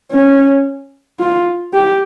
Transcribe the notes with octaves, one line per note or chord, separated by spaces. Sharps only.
C#4
F4
G4